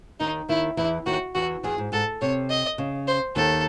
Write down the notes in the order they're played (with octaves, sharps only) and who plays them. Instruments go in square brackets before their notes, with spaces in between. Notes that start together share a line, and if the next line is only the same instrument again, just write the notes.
[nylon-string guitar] D#2 D#3 [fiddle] D#4
[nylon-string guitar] D#2 D#3 [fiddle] E4
[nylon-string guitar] E2 E3 [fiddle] E4
[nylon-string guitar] D#2 D#3 [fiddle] F#4
[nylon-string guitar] E2 E3 [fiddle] F#4
[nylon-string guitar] E2 E3 [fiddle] G#4
[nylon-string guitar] G#2
[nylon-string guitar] G#2 [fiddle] A4
[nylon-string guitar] C3 [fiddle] C#5
[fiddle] D#5
[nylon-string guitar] C#3
[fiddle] C5
[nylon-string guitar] D#2 D#3 [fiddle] A4